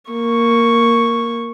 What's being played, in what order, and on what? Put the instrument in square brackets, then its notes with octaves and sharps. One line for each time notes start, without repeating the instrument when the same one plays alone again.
[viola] A#3 C#6